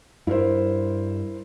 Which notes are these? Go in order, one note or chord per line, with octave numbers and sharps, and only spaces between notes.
G2 E4 A#4 C5